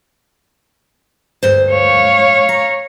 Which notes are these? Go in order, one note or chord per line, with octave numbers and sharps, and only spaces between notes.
D2 G2 C5
C#5 F5
A#5